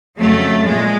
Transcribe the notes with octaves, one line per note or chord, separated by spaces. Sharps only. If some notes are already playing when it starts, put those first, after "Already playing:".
F2 C#3 F#3 A3
A#2 G#3